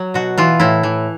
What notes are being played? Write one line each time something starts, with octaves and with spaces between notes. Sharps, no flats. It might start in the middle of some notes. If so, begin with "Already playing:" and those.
Already playing: F#3
B2 F#4
E3 F4
A2 E4
E3